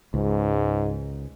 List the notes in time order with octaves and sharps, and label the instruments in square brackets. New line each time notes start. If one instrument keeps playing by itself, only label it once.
[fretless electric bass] C#2 [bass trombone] G#2